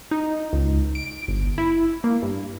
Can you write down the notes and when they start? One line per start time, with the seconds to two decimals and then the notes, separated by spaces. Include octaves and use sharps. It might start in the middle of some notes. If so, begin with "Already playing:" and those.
0.11 D#4
0.53 C#2
0.95 D7
1.28 G1
1.58 E4
2.04 A#3
2.22 G2